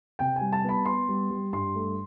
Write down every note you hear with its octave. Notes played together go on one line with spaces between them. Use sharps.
C3 G5
G#5
G3
A5
B3 B5
B3 C6
G3
G3
G2 C6
A3